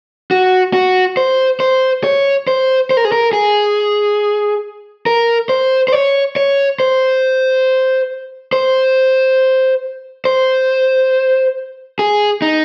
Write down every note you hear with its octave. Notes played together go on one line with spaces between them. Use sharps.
F#4
F#4
C5
C5
C#5
C5
C5
A#4
G#4
A#4
G#4
A#4
C5
C5
C#5
C#5
C5
C5
C5
G#4
D#4